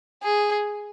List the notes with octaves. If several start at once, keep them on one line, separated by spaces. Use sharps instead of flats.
G#4